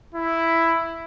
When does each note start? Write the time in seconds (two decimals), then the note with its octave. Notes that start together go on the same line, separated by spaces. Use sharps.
0.14 E4